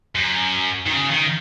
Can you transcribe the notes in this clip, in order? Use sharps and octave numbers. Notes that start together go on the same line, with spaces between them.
F#2
D#3
C#3
D#3